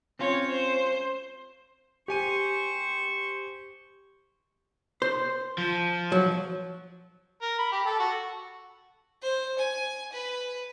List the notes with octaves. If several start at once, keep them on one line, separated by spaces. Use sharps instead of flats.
C4 C#4 F4 C#5
C5
G4 C5 G#5 C#6 D#7
C5
F3
F#3
A#4
B5
G4
A4
F#4
C5
G#5
B4